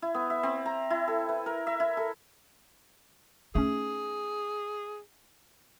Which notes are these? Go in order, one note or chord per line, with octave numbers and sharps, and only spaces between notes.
E4
B3
E5
C4
A#5
E4
A4
B4
A#4
E5
E4
A4
A3 C#4 D#4 G#4